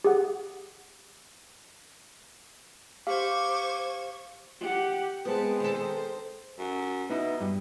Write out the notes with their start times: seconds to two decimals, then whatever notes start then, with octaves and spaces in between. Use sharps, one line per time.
0.04 G4 G#4 F#5
3.07 G4 C5 F5 C#6 D6 G#6
4.61 G4 F#5
5.25 G#3 B3 C4 B4 A5
5.60 D#3 A4 C5
6.58 F#2
7.10 B2 B3 D#4 E4
7.41 G2